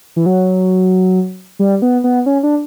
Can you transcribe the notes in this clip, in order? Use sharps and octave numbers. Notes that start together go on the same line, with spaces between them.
E3
F#3
G3
B3
B3
C#4
D4